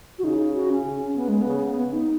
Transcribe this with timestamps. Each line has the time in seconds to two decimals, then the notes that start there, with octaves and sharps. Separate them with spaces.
0.19 F#4
0.24 C#3 D#4
0.55 F#4
0.70 C#4
0.85 C#3
1.16 B3
1.28 G#3
1.42 C#3 B3
1.77 B3
1.92 D#4